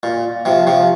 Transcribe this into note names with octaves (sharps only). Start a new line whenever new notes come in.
A#2
C3 F3
C3 F3